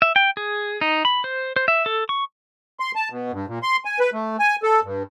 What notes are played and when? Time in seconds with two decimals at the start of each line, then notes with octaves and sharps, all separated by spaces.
0.02 E5
0.16 G5
0.37 G#4
0.81 D#4
1.05 B5
1.24 C5
1.56 C5
1.68 E5
1.86 A4
2.09 C#6
2.80 C6
2.95 A5
3.10 B2
3.32 G2
3.48 A#2
3.63 C6
3.85 G#5
4.00 B4
4.13 A3
4.39 G#5
4.63 A4
4.83 G2